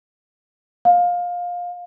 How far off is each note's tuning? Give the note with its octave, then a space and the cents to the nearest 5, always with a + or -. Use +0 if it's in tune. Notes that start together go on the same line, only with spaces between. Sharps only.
F5 +20